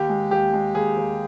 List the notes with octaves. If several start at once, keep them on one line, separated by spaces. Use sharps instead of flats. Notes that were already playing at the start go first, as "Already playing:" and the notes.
Already playing: D#2 G4
G#3
D#2 G4
G#3
D#2 G#4
D#2